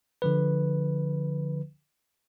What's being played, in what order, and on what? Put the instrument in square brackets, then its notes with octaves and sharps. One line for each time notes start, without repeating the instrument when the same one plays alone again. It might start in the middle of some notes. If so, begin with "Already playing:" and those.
[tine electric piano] D3 F3 B4